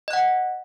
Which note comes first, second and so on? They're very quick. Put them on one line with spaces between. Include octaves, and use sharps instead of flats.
D#5 F#6 F#5